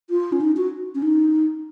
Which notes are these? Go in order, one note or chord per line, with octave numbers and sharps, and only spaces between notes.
F4
C#4
D#4
F#4
C#4
D#4